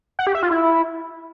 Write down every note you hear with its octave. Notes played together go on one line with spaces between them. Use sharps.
F#5
G4
E5
F4
E4